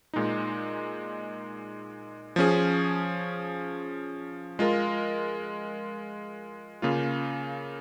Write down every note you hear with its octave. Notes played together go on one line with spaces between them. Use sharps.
A#2 G#3 D#4
F3 C#4 G#4
G#3 F4 A#4
C#3 A#3 F4